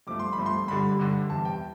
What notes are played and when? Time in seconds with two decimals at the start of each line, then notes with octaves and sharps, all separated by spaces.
0.07 G2 F3 A3 D6
0.19 C6
0.33 B5
0.38 G2 F3 A3
0.46 C6
0.68 G2 D3 G3 B5
0.99 G2 D3 G3
1.30 E2 C3 G3 A5
1.45 G5